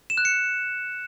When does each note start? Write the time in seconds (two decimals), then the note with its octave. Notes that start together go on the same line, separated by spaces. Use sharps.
0.10 E7
0.18 F#6
0.25 C#7